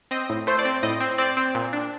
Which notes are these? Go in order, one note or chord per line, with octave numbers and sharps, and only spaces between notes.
C4 D#5
A2
A3 C5
D5
C4
A2 D#5
C4
C4 D5
C4
A#2
D4